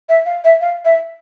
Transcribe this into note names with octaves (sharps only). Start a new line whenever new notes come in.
E5
F5
E5
F5
E5